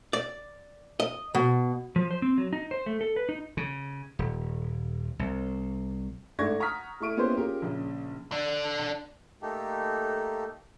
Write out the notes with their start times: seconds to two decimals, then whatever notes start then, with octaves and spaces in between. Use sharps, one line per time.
0.13 D5
1.00 D#5
1.35 B2
1.96 F3
2.11 C5
2.22 C4
2.38 F#3
2.53 D#4
2.71 C5
2.86 A3
3.01 A4
3.16 B4
3.29 D#4
3.57 C#3
4.19 D#1
5.19 C2
6.39 G#2 A3 D4 C#6 G#6 A#6
6.60 F#5 A#5 C#6 D#6 F6 B6
7.00 A3 E4 C#6 D7 D#7
7.17 A#3 B3 C#4 E4 G4 C5
7.37 C#4 F4 G4 G#4 A#4
7.62 A#1 C#3
8.32 D3 D4
9.42 A3 A#3 D#4 G4 A4